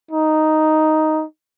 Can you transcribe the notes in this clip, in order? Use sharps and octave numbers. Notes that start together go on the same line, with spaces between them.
D#4